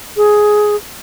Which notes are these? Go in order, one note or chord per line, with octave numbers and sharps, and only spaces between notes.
G#4